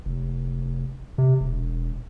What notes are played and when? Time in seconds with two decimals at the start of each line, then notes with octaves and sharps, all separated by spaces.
0.06 F1
1.18 C3
1.41 E1